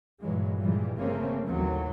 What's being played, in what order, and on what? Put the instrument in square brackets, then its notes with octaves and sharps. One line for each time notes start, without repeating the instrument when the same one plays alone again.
[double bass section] G2 A#2 E3 F#3 G#3
G2 A#2 E3 F3 G3 G#3
G1 C#3 A3 A#3 C4 C#4
A1 D#2 D3 E3 F#3 C4